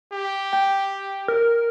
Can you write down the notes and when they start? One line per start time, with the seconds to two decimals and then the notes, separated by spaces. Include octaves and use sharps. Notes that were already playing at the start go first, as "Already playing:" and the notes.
0.13 G4
0.53 G5
1.28 A#4